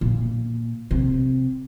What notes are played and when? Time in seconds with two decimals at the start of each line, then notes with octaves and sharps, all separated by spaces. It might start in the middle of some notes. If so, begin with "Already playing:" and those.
0.01 A#2
0.91 C3